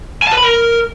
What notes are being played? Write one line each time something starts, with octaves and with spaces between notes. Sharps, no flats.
G#5
A5
B4
B5
A#4